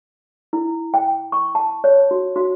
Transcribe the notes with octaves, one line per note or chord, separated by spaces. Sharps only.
E4
G5
C#6
A5
C#5
F#4
F#4